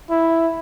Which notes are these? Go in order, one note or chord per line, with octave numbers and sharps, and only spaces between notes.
E4